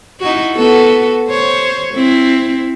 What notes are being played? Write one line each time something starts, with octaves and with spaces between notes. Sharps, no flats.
D#4 E4 F#4
B3 F#4 A4
C5 C#5
C4 E4